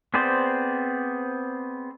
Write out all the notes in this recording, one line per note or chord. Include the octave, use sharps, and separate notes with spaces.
B3 C4 G#4 C5 D5